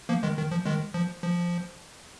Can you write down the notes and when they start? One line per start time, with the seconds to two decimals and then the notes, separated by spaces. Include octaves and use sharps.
0.09 F3 A#3
0.23 D#3 G#3
0.38 D#3
0.51 F3
0.66 D#3 G#3
0.94 F3
1.23 F3